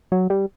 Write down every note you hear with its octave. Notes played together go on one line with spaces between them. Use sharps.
F#3
G3